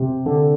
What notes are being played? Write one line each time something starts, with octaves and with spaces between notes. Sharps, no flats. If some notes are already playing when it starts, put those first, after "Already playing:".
Already playing: C3
D3